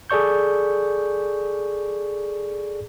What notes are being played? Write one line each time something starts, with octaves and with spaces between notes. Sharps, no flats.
G#4 A4 D5 C#6 G6